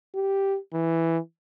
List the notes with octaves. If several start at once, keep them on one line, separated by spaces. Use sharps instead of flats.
G4
E3